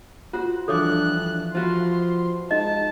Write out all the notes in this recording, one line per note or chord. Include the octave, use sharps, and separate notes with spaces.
F4 F#4 C5
G2 E3 F3 D4 A4 C#5 D6 F#6
F3 F4 F#4 B4 C6
G#2 D#5 A5